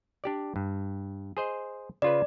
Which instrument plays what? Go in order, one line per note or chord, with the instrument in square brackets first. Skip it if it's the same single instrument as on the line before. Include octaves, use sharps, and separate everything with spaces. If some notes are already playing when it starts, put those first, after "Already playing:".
[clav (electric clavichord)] D4 G4 D5
G2
G#4 C5 D#5
[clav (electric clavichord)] C#3 F4 B4 [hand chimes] D5